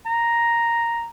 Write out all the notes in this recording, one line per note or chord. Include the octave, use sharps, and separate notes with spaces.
A#5